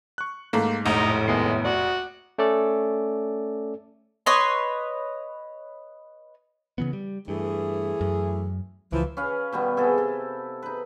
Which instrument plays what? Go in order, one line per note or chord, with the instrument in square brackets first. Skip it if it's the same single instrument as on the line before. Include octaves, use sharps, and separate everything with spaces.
[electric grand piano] C#6 F#6
[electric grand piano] G#2 [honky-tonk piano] A3 A#3
[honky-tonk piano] F1 A#1 [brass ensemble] A2 [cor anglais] D#4
[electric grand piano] D#2 B3 C7 [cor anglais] G#3
[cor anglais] F#4 [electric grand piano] D5
[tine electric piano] A3 C#4 A4 D5
[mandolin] B4 C#5 D#5 C6
[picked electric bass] C#3 E3 B3
G3
[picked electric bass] G2 [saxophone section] E3 A3 G#4
[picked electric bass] F#2
[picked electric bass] C#2 [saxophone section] E3 F3
[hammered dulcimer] C#4 B4 F5
B2 D#3 G3 B3
C3 E4 G#4 A4
A4
D#4 B4